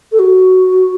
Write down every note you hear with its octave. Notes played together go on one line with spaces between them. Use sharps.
A4
F#4